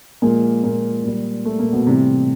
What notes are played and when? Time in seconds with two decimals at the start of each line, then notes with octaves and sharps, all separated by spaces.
0.22 A#2 F3 G#3 A#3
0.63 A#2 A#3
1.04 A#2 G3
1.45 A3
1.59 A#2 A#3
1.73 B2 B3
1.86 A2 C3 E3 G3 C4